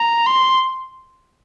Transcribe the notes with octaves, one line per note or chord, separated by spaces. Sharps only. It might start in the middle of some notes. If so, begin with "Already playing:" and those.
Already playing: A#5
C6